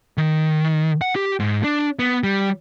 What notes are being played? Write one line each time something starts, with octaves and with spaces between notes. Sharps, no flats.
D#3
F#5
G4
G#2
D4
B3
G3